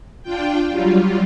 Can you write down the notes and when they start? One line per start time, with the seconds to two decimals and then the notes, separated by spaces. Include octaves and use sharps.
0.23 D4 F4 G5
0.70 F#3 G3 F4